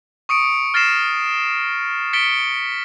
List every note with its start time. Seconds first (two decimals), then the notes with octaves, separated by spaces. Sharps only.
0.29 C#6 D#6 C#7 D7
0.74 F6 A6 A#6 C7 E7
2.13 A6 B6 C#7 D7 G7